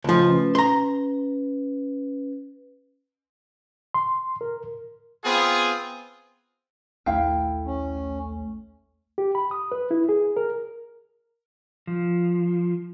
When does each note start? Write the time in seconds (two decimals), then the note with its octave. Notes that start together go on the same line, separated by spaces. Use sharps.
0.04 C#2 F3 A3 F4
0.28 C#4 B4
0.55 A#5 C6
3.94 C6
4.41 A#4
5.24 B3 C4 F4 G#4
7.06 A#1 D#2 A3 E4 F5 G5
7.65 C#4
9.18 G4
9.35 B5
9.51 D#6
9.72 B4
9.91 E4
10.09 G#4
10.37 A#4
11.87 F3